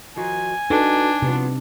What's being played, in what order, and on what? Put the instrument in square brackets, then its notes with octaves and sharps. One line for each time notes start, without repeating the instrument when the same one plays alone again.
[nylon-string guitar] D#3 F3 F#4 [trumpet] G#5
[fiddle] D4 [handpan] D#4 [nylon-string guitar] F#4 A4 B4
[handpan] C3 [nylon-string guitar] F3 F#3 B3